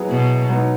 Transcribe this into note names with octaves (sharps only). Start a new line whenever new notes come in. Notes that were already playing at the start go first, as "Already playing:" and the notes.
Already playing: F#3 B3 E4 G#4
B2
F#3 B3 D#4